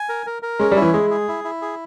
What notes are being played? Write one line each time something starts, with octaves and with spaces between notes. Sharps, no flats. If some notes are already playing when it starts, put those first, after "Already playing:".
Already playing: G#5
A#4
A#4
A#4
G#3 C#4
G3
E4
E3
G#3 G#4
G#4
E4
E4
G#4